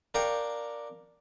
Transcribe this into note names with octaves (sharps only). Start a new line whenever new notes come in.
D4 A#4 F5 G5 A#5 C#6